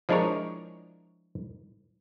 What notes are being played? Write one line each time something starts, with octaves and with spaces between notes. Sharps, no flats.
F3 G#3 D4 E4 A#4 C#5